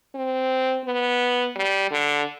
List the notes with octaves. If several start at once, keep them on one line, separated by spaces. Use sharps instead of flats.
C4
B3
G3
D3